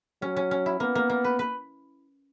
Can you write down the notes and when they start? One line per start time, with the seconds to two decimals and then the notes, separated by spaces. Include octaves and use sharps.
0.22 F#3 C#4
0.36 C#4
0.51 C#4
0.66 E4
0.80 A#3 B3
0.95 A#3
1.10 A#3
1.24 B4
1.39 B4